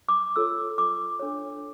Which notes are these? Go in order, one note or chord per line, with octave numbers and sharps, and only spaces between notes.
D6
F4 A4 C#5 E6
D6
D4 A4 C#5